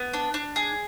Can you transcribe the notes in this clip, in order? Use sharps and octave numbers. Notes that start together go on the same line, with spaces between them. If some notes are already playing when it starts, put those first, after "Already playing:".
Already playing: B3
D4
D4
G#4